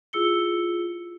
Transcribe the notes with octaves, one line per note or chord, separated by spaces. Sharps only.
E4 F4 G#4 E6 C#7 G7